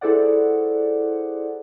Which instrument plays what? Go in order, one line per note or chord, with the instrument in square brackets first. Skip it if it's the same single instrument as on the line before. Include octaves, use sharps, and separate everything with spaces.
[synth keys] E4 G#4 A4 C5 D5 F#5